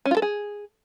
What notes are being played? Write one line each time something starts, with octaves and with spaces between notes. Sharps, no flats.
C#4
F4
A4
G#4